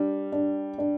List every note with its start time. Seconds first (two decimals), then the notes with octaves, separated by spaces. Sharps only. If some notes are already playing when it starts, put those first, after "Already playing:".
Already playing: G3 D4
0.32 D4
0.78 D4